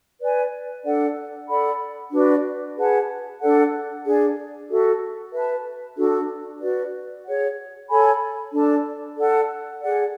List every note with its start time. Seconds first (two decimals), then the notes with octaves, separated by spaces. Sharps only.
0.20 B4 D5 G#5
0.84 D4 A4 D5 F#5
1.48 A4 D5 F#5 B5
2.11 D4 F#4 B4 D5
2.76 G#4 B4 F#5 A5
3.40 D4 A4 D5 F#5
4.04 D4 G#4 D5
4.69 F#4 A4 E5
5.33 B4 E5 A5
5.96 D4 F#4 A4
6.60 F#4 B4 D5
7.25 G#4 C#5 F#5
7.89 A4 C#5 G#5 B5
8.53 D4 A4 D5 A5
9.17 A4 D5 F#5
9.81 G#4 D5 F#5